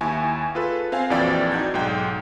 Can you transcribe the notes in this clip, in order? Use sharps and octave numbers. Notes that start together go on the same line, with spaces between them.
D#2 E4 G#5 C#6
F4 G#4 A4 B4
C4 F5 G#5
A#1 F2 E3 F#4 D5 G5
D#4 F#4 G6 G#6
B1 G#2 G5